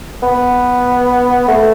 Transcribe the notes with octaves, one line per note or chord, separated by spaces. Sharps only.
B3
A3